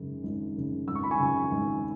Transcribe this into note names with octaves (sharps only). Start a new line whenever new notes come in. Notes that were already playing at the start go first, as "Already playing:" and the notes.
Already playing: G#1 F#2 C#3
G#1
F#2 C#3
G#1 E6
C#6
B5
G#5 C#6
F#2 C#3
G#1